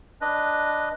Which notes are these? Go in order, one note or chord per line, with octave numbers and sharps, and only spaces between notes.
D4 B4 D#5